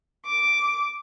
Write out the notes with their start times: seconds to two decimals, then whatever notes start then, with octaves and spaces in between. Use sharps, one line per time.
0.25 D6